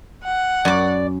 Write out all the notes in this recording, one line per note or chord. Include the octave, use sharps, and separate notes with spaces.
F#5
F#2 D5 D6